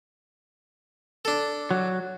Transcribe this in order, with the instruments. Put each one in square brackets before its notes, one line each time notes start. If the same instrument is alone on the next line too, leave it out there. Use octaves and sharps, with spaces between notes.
[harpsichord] D4 A4
[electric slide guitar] F#3